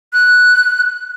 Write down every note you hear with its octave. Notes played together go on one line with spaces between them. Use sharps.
F#6